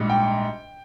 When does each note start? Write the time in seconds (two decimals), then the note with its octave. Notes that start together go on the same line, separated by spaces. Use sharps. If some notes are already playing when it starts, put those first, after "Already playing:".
Already playing: A#1 G#2 G3
0.09 G5